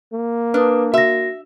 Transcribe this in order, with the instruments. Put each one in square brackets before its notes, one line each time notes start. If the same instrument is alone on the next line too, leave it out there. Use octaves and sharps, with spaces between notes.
[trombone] A#3
[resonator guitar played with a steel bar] D4 [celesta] B4 D#6
[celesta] F#4 A#6 [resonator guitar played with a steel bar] E5